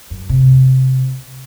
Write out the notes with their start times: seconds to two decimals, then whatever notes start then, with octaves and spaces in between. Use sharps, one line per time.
0.10 F#2
0.29 C3